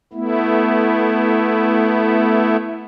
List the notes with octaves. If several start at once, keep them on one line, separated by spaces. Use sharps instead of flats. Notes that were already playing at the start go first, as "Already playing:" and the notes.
A3 B3 E4